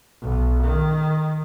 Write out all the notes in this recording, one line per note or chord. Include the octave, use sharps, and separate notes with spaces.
B1
D#3